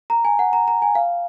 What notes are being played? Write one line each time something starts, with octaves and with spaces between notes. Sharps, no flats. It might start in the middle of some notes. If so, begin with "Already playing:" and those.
A#5
G#5
F#5
A#5
A#5
G#5
F5